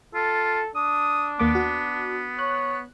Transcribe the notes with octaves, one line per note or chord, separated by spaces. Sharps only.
F4 A4
D4 D#6
D#2 A#3 B3 D6
F#4
C#5 F#6